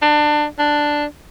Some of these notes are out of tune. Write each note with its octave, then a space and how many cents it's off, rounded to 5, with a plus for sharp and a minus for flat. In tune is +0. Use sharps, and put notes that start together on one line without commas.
D4 +25
D4 +5